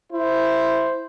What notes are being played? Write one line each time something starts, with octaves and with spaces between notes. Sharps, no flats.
E4 C5